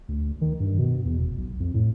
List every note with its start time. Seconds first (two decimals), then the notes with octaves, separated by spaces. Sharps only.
0.08 D2
0.41 D#3
0.60 G2
0.79 B2
1.05 E2
1.18 F1
1.37 B1
1.60 F2
1.74 A2